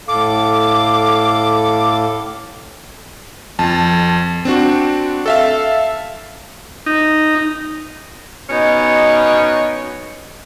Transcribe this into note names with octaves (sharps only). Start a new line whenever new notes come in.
A2 A4 F5 D6
F2 A5
C4 D4 F#4
A4 E5 F5
D#4
B2 C#4 D#4